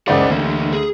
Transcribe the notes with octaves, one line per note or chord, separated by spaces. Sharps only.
F#1 C#2 C5 D5 F#5
D2 E3 A#3
G#4